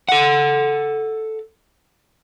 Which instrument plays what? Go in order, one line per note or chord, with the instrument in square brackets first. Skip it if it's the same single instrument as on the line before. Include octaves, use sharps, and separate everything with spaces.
[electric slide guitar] A4 F#5